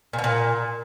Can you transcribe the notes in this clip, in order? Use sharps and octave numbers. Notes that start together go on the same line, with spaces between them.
A#2
B2
A#2